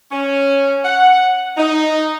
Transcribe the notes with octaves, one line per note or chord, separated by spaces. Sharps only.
C#4
F#5
D#4